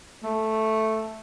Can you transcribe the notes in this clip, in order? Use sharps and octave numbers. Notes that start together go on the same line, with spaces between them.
A3